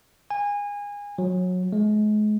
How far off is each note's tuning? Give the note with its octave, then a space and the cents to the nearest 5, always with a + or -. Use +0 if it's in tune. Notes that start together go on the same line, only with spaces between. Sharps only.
G#5 -25
F#3 -25
G#3 +35